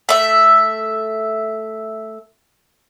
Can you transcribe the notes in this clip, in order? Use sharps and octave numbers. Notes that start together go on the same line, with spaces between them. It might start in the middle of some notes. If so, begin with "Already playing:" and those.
A3 E5